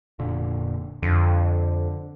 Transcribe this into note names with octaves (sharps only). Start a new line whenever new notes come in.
F1 A#2 D3
F2 D3